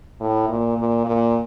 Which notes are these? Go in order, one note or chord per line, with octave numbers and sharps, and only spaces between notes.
A2
A#2
A#2
A#2